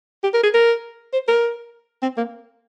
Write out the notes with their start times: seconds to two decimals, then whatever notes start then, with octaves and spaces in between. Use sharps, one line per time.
0.24 G4
0.34 A#4
0.43 G#4
0.54 A#4
1.13 C5
1.28 A#4
2.02 C4
2.17 A#3